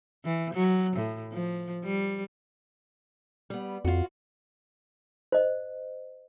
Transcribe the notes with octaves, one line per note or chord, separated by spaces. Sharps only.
E3
F#3
A2
F3
G3
G3 B3
F2 F4 F#4
C5 D#5